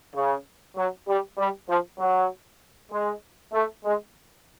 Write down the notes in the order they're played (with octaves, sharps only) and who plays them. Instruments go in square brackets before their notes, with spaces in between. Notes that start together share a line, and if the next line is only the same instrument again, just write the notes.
[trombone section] C#3
F#3
G3
G3
F3
F#3
G#3
A3
G#3